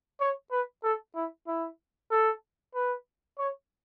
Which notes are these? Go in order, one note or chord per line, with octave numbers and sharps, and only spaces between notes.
C#5
B4
A4
E4
E4
A4
B4
C#5